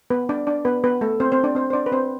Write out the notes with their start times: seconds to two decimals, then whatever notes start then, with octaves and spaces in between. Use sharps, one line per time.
0.10 B3 B4
0.29 D4 D5
0.47 D4 D5
0.65 B3 B4
0.84 B3 B4
1.01 A3 A4
1.20 C4 C5
1.32 C4 C5
1.44 D4 D5
1.55 C4 C5
1.70 C5
1.73 D4 D5
1.86 B4
1.92 C4 C5